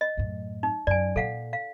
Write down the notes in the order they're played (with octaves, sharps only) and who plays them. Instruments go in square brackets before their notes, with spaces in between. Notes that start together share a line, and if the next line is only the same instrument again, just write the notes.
[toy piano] D#5
[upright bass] F#2 A2
[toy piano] D#4
[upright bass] F#2 [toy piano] D5 G#5
[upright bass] A#2 [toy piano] A4 F5 F#5
[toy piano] F5